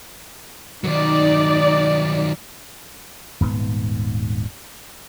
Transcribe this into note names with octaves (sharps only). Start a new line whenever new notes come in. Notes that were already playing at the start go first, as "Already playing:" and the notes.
D#3 F#3 D#4 D5
D#1 G#2 B3